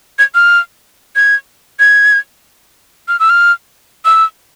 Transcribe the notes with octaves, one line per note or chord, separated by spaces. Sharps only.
G#6
F6
G#6
G#6
F6
E6
F6
E6